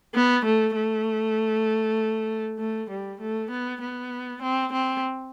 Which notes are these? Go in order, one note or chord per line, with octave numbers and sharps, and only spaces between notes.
B3
A3
A3
A3
G3
A3
B3
B3
C4
C4